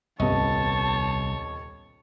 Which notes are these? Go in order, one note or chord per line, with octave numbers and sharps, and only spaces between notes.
D#1 C2 B3 C#5 D#5 A5